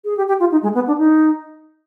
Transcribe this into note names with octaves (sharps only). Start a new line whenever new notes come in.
G#4
G4
G4
F4
D#4
G#3
B3
D4
D#4